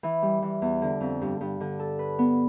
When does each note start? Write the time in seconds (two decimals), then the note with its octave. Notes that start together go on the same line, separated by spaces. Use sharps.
0.03 E3
0.22 G3
0.42 E3
0.62 E2
0.82 D3
1.01 F2
1.22 G2
1.41 G2
1.60 D3
1.79 A4
1.99 B4
2.19 B3